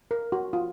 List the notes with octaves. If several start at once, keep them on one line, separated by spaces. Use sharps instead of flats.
A#4
F#4
F4